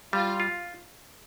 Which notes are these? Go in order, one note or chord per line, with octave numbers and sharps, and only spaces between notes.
G3 F4
F4